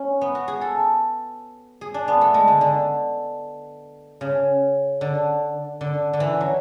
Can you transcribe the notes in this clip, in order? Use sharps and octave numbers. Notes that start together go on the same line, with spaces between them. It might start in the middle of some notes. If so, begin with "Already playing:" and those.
Already playing: C#4
B3
F#4
G#4
A4
G#4
D4
B3
A3
G#3
D3
D3
C#3
D3
D3
D3
E3
F#3